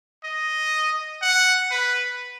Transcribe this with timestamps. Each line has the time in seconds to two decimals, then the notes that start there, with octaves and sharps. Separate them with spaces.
0.24 D#5
1.22 F#5
1.71 B4